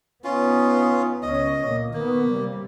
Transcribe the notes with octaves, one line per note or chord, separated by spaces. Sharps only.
B3 C#4 D#4 F4
C#2 C#4 D#5
A#2 A#3
D#3 A#3 B3
C3 G3